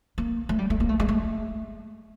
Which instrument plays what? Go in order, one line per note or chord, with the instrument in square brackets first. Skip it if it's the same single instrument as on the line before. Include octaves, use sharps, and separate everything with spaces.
[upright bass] A#3
A3
G3
A3
A#3
A3
G#3
A3